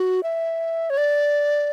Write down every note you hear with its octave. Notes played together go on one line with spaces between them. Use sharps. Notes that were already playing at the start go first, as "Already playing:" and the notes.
Already playing: F#4
E5
C#5
D5